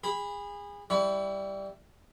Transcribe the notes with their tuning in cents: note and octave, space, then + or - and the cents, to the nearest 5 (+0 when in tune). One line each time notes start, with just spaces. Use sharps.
G#4 -30 B5 +0
G3 +0 E4 +0 C#6 +45